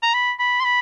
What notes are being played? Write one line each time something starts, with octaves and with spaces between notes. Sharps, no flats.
A#5
B5
B5
C6
B5